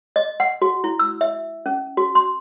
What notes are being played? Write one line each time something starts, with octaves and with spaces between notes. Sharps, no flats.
D#5
F#5
F#4
E4
E6
E5
C#4
F#4
C6